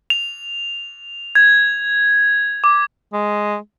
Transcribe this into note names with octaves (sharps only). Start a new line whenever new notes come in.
F7
G#6
D6
G#3